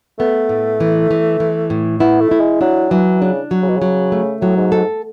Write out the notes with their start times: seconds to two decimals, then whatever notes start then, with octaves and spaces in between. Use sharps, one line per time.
0.19 A3 B3
0.49 A2
0.80 E3
1.11 E3
1.40 E3
1.70 A2
2.00 B3 E4
2.20 A3
2.31 E4
2.40 G#3
2.61 F#3 D4
2.91 E3 F#3
3.21 C#3 D4
3.51 F#3
3.62 C#3
3.70 B2
3.77 C#3 F#3
4.12 A3
4.41 A2 F#3
4.57 G#2
4.72 G#2 A4